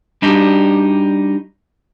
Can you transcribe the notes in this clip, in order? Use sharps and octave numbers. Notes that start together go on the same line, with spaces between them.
G3 D4 D#4 F#4 G4